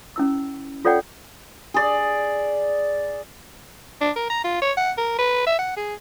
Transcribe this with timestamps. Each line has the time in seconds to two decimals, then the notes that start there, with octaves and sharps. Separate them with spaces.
0.16 C#4 E4 E6
0.85 F4 A4 C#5 D5 F#5 G5
1.74 G#4 D5
4.01 D4
4.16 A#4
4.30 A#5
4.44 F4
4.61 C#5
4.77 F#5
4.98 A#4
5.19 B4
5.46 E5
5.58 F#5
5.77 G#4